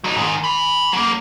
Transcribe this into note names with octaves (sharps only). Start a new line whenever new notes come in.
F#3 D#4
G#2 D#3
G#5 B5
F#3 A#3